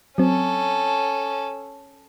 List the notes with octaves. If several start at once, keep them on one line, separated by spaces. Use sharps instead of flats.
F#3 C4 C#4 A4